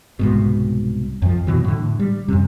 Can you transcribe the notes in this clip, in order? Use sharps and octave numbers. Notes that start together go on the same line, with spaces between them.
C2 G#2 B2
F2 F3
F2 B2 E3 F#3
A2 D3
G3
F2 C3